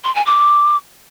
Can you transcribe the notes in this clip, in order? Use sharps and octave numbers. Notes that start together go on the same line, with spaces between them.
C6
G#5
D6